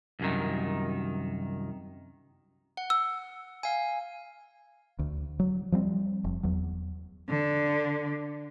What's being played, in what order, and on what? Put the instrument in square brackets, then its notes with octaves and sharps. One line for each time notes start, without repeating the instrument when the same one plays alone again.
[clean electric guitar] C2 F#2 D#3
[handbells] F#5
[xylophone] E6
[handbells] F5 G#5
[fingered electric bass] D2
F#3
F3 G3 A#3 C4
F1
E2 F#3
[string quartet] D3